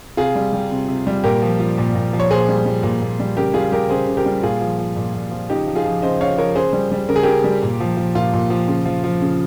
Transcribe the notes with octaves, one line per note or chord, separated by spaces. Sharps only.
C3 F4 G#4
G3
G3
C3
C3
G3
A#2 G4 A#4
F3
F3
A#2
A#2
F3
C#5
A#2 G#4 C5
G3
G3
A#2
A#2
G3
C#3 G4 A#4
G3 F4 G#4
G3 G4 A#4
C#3 G#4 C5
C#3
G4 A#4
G3
A#2 F4 G#4
F3
F3
A#2
A#2
F3
C#3 D#4 G4
F3
F4 G#4
F3
C#3 C5 D#5
C#3 C#5 F5
F3 A#4 C#5
C#3 G#4 C5
G3
G3
C#3 A#4
G#4
C#3 G4 A#4
G3
A#2
F3
F3
A#2 F4
A#2
F3
C#3
F3
F3
C#3